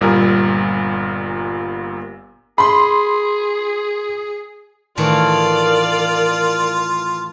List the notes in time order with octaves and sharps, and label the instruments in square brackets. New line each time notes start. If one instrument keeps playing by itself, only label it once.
[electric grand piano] G1 A#2 G3 A#4
[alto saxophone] G#4 [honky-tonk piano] B5 C6
[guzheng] A2 D#3 E3 [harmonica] F4 [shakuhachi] A#4 [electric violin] D5 F5